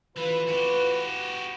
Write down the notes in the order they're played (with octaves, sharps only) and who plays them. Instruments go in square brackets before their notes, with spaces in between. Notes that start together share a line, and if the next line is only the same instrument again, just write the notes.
[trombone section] A1 F4 B4 [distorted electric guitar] E3
[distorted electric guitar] F#4 G4